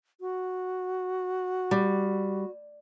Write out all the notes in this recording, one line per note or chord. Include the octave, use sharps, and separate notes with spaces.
F#4
G3